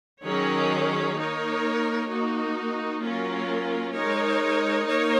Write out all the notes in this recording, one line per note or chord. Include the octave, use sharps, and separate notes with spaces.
D#3 F#3 C#4 G#4 C#5
A#3 D#4 A#4 C#5
A#3 D#4 F#4
F#3 A#3 C#4 F4 A#4
G#3 D#4 A#4 C#5
A#3 D#4 A#4 C#5